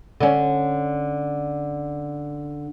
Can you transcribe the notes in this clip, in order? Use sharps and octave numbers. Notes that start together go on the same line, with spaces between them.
D3 C#4